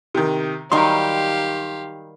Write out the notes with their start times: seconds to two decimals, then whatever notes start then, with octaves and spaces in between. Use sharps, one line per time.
0.15 C3 D#3
0.72 D#3 F#3 G3 G4 F5 C6